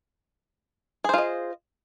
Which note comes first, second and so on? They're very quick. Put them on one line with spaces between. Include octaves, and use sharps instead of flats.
G#4 C5 F4 D#5